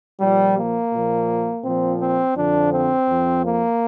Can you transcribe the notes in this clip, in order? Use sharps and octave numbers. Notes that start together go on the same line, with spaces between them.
A#2 F3 G3
A#3
A#2 F3
A#2 F3 C4
C4
F2 D3 F3 D4
C4
F2 F3
A#3